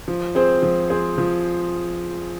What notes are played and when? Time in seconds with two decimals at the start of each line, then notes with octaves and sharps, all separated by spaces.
0.08 F3
0.35 C4 G#4 C5
0.62 F3
0.90 C4 G#4 C5
1.18 F3